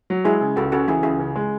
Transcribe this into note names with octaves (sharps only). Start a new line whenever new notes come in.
F#3
G#3 E4 G#4
C#3
C#2 F#4 A4
C#3 F#4 A4
E3 E4 G#4
C#2 E4 G#4
C#3
G#3